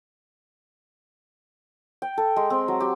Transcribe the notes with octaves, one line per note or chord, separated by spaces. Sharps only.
G5
A4
G#3
C4
F#3
G4